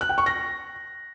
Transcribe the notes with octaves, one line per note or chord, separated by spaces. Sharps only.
F#6
G5
C#6
A#6